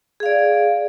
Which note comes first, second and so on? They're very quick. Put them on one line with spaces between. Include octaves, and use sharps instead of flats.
G#4 F5 D5